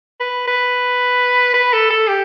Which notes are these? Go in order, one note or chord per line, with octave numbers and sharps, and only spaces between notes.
B4
B4
B4
A4
A4
G4